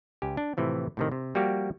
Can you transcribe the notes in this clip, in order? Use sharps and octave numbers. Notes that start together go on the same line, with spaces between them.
C#2 G4 G#5
D4
A2 C3 E3 F3
A2 C3 D#3
C3
F3 G3 A#3 F#4 G4